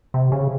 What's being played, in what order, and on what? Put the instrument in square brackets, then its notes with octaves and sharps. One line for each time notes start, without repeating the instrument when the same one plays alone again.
[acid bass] C3
C#3